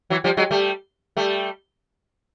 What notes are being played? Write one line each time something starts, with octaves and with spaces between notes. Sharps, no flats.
E3 F#3
F3 G3
F#3 G#3
G3 A3
G3 A3